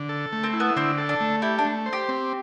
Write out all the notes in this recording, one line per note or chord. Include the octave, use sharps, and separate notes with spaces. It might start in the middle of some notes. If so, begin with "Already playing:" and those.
Already playing: D3
A4
A3
C4
E4
B3
D3 C4
A4
D4
A3
E4 G4
D4
A3
C5
G4
C4